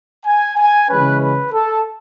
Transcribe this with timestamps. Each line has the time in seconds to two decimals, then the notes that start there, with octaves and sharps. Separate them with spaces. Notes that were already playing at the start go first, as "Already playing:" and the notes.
0.25 G#5
0.57 G#5
0.90 C#3 E3 G#3 C#4 B4
1.21 B4
1.53 A4